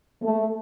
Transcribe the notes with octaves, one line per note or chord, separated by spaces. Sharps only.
A3